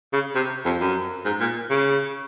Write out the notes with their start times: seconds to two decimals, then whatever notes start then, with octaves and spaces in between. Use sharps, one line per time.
0.13 C#3
0.36 C3
0.65 F2
0.81 F#2
1.25 G#2
1.40 A#2
1.70 C#3